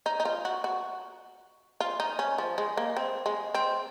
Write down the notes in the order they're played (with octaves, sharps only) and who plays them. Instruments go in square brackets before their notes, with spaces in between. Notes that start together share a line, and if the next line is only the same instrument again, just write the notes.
[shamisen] D#4
D#4
F4
F#4
F#4
F4
D#4
C#4
F3
G#3
A#3
C4
G#3
C4